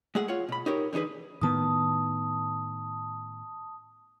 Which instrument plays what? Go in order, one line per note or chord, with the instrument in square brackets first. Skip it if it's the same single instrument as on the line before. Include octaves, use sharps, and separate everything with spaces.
[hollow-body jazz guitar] G#3 A3 G#4 F#5
F4 C#5 F#5
B2 B5
D#4 G4 A#4 C#5
D3 E3 D#4 G#4 B4
[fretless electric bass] A2 D#3 B3 [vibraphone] A5 D#6